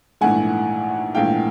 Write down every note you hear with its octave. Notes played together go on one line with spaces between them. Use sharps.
A#1 G#2 E3 A3 F#5 G#5
A#1 G#2 E3 A3 F5 G5